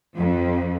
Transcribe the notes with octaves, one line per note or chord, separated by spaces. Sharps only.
F2